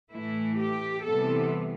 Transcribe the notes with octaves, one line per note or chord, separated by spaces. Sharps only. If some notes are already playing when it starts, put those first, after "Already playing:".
A2 E3 A3 E4
G4
C3 E3 G3 B3 A4